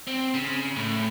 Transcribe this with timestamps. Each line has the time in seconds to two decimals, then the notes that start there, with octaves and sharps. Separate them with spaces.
0.07 C4
0.34 C#3
0.77 A2